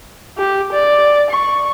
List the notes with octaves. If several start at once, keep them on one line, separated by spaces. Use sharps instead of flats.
G4
D5
C#6